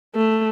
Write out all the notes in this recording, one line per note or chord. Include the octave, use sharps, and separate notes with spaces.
A3